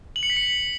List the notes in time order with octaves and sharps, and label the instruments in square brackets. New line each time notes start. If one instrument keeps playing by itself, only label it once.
[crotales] F#7
C#7
B6
C#7